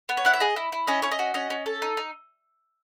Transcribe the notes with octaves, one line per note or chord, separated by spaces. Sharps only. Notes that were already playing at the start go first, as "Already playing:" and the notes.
B3
C#5
E4 F#5
E5
G#4 D#5
E4
E4
C#4 D#5
C#4 C#5
D#5
F#4
C#4 D#5
C#4
A4
D#4
D#4